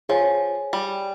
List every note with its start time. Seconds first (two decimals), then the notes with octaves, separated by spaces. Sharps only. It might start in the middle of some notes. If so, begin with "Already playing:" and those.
0.09 F3 G#4 C#5 G#5
0.73 G3